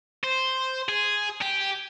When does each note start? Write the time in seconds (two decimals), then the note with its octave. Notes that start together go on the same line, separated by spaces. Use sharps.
0.24 C5
0.89 G#4
1.42 G4